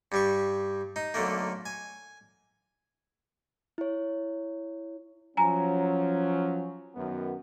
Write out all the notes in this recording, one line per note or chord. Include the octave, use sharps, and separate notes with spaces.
G2 G3 C#6
D#4
B1 D3 A3 A#3
G#5
E4 C#5
F3 F#3 C#4 G#5 A#5
F#2 D#3 B3